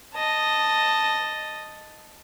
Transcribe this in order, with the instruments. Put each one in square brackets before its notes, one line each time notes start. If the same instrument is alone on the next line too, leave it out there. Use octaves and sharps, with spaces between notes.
[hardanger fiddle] D#5 A5